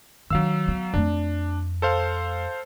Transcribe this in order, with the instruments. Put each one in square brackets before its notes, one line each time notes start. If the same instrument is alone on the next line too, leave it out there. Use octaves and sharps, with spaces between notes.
[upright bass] D#3 D4 [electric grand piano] F#3 F5 E6
[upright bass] B3
[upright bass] F2 A3 [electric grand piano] D4
[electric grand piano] A4 C5 F5